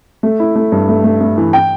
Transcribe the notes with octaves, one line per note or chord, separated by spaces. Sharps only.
A3
E4
A3
G2
A3
A3
A3
E3
G5